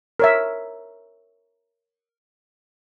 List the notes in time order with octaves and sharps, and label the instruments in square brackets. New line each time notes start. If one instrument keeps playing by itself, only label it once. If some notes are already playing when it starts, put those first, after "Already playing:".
[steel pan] A#4 C#5 E5